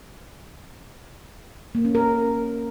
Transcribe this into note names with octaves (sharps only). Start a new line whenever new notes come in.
A#3
C#4
A#4